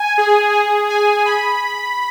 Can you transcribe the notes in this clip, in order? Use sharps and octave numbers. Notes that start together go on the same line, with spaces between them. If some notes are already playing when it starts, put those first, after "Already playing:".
Already playing: G#5
G#4
G#4
G#5
B5